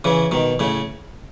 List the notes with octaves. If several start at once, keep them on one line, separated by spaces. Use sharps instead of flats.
C#3 E3
B2 D#3
A2 C#3